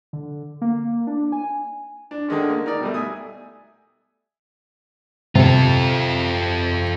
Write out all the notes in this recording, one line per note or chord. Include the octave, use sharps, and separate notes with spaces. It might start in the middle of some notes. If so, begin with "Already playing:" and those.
D3
A#3
D4
G#5
D4
D3 D#3 G#3 C#4
A#3
D#4 A#4 D5
B2 G3 A3
E5 G#5 D#6
C3 F4 A4